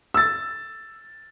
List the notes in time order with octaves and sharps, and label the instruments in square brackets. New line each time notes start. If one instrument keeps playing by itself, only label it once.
[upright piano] E6 A6